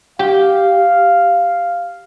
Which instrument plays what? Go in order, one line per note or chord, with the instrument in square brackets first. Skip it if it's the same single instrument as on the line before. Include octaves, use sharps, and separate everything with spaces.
[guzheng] G4 [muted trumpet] F5